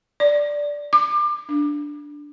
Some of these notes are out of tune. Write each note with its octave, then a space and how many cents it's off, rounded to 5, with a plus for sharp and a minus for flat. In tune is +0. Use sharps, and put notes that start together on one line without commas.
D5 -5
D6 +30
D4 -5